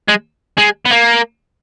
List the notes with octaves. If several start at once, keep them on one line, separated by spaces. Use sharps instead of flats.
G#3
G#3
B3
A#3